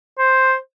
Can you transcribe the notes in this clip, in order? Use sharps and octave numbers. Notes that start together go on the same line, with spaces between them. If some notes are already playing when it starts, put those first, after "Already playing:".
C5